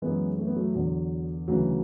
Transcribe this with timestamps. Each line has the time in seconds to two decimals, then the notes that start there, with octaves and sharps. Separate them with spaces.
0.02 F#2 E3 G#3 B3
0.38 A3
0.47 B3
0.56 F#3 A3
0.75 E2 D3 F#3
1.48 D2 C#3 E3 F#3